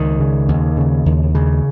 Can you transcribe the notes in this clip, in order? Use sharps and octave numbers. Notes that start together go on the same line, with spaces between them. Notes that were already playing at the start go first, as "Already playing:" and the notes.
Already playing: C#2 D#3
C#3
D#2
C#3
D#2
C#3